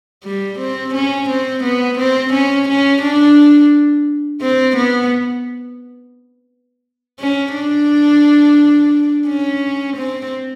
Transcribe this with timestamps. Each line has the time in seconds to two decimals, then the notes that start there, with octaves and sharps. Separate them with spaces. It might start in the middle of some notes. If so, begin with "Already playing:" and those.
0.25 G3
0.59 C4
0.94 C#4
1.29 C4
1.64 B3
1.98 C4
2.33 C#4
2.69 C#4
3.02 D4
4.41 C4
4.77 B3
7.20 C#4
7.54 D4
9.27 C#4
9.97 C4